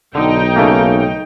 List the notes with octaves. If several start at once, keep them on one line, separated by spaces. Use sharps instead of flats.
B1 D3 D#4 G5
C#3 A3 A#3